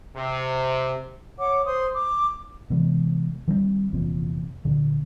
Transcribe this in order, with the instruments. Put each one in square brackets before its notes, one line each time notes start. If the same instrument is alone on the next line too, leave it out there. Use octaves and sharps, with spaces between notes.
[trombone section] C3
[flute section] C#5 F#5 D6
C5 C6 D#6
D6
[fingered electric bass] C3 E3 G#3 B3
D#3 G3 A#3 C4
F1 E2 A#2 C4
D2 A#2 D3